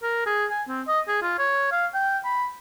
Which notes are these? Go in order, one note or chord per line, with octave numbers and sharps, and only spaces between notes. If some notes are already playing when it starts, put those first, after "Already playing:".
A#4
G#4
G#5
C4
D#5
G#4
F4
C#5
F5
G5
B5